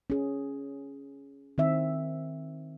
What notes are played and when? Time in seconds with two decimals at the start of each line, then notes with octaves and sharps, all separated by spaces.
0.10 C#4 G#4
1.58 D#3 C4 E5